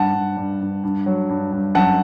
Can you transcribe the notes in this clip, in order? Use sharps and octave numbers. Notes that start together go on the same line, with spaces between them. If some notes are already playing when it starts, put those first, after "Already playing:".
Already playing: G2 F#5 A5
G2
G2
G2
G2
F#3
G2
G2
F#2 F#5 A5